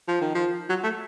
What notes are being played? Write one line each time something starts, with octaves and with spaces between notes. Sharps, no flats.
F3
D#3
F3
F#3
A3